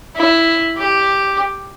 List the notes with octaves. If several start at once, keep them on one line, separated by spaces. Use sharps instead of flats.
E4
G4